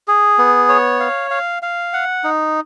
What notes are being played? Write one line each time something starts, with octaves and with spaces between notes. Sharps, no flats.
G#4
B3
C#5
F5
F5
F5
F#5
D#4